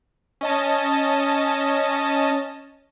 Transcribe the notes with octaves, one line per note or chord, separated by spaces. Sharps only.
C#4 D#5 A5